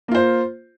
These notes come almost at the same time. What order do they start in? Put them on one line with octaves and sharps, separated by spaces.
A#3 F4 C5